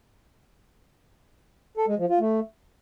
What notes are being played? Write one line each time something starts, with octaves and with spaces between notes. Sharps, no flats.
A4
G#3
F3
F4
A3